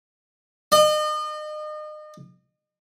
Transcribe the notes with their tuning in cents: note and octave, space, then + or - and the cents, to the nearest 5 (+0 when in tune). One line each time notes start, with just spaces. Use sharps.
D#5 -35